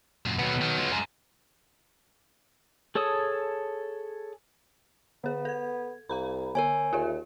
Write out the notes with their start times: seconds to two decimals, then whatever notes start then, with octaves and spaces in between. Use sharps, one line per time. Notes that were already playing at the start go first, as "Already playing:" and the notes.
0.26 F#2 A#2
0.39 D#2 B2 F#3 B3
0.61 D#3
0.78 G#3 F4
0.92 F#2
2.95 G#4 A4 C#5 A5 D#6
5.24 D3 B3 G#4
5.45 A4 G#6
6.09 C2 F5 A#5 B5
6.55 D3 A#4 C#5 G#5
6.93 D#2 F4 G#4 E5